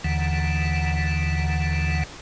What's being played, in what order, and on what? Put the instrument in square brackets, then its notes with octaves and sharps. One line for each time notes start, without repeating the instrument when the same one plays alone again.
[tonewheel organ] D#2 D3 E3 F#5